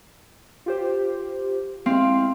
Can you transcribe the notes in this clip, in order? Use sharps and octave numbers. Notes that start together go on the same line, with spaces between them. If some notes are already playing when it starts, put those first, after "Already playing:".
F4 G4 C5
G#3 C4 E4 F5